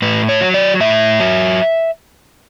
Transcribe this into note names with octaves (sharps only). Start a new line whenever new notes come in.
A2 B4
C#5
F#3
D5
A2 E5
F#3